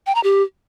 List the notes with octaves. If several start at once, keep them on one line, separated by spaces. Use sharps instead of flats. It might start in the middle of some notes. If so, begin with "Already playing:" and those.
G5
A#5
G4